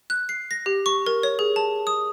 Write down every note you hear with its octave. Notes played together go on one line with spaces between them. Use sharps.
F#6
C7
A#6
G4
C#6
A#4
C#5
G#4
A5
D#6